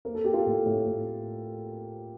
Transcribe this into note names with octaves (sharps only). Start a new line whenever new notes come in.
A#3 A#4
A4
A#3 G4
F4 A4
A2
A2
A2